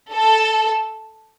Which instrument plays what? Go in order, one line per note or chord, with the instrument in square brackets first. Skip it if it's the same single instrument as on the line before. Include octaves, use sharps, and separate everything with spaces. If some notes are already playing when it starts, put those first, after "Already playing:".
[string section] A4